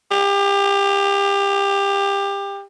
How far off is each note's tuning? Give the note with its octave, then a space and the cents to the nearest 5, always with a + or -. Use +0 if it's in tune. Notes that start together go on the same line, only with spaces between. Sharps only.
G4 +25